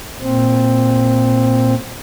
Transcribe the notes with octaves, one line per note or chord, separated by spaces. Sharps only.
A#2 C4